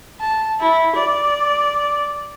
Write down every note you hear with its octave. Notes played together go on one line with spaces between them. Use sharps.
A5
E4
D5